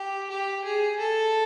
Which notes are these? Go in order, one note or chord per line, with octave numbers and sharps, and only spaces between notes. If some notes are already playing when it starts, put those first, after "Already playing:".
Already playing: G4
G4
G#4
A4